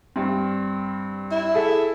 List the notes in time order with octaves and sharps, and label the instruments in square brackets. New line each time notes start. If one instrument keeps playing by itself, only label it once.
[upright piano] G2 C4
[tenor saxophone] E4
[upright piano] G#4 A4 E5